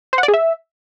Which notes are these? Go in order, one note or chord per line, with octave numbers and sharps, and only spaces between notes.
C5
F#5
D5
G#4
E5